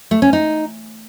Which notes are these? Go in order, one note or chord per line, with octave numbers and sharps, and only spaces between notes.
A3
C#4
D#4